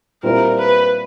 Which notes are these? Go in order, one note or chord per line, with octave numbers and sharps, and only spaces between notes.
A#2 G3 C4 E4 A#4
B4